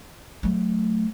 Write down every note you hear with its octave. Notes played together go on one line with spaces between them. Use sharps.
F#3 A3